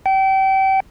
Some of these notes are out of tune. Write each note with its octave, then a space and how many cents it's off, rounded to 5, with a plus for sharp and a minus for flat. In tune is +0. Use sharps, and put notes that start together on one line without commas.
G5 -30